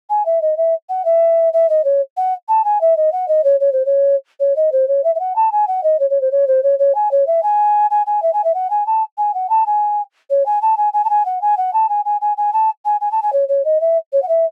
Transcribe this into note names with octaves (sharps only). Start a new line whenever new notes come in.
G#5
E5
D#5
E5
F#5
E5
E5
D#5
C#5
F#5
A5
G#5
E5
D#5
F#5
D#5
C#5
C#5
C5
C#5
C#5
D#5
C5
C#5
E5
E5
F#5
A5
G#5
F#5
D#5
C#5
C#5
C5
C#5
C5
C#5
C#5
G#5
C#5
E5
G#5
G#5
G#5
E5
G#5
E5
F#5
G#5
A5
G#5
F#5
A5
G#5
C#5
G#5
A5
G#5
G#5
A5
G#5
F#5
G#5
F#5
A5
G#5
G#5
G#5
G#5
A5
G#5
G#5
A5
G#5
C#5
C#5
D#5
E5
C#5
F#5
E5